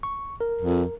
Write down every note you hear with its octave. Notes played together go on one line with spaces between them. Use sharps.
C#6
A#4
F2